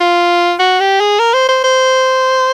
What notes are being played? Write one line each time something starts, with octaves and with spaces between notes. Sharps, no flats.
F4
F#4
G4
G#4
A#4
C5
C5
C5